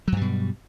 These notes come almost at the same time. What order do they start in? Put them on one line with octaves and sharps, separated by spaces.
F#3 G2 G3 B2